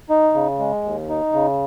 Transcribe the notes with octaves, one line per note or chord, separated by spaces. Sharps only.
D#4
C#3
G#3
D#2
D#4
C#3